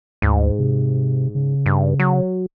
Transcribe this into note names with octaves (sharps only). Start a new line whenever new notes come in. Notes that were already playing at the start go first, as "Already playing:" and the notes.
D2 G#2
C3
C#3
G2
F#3